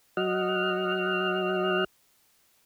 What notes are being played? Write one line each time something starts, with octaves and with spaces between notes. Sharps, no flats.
F#3 D#5 F#5 F6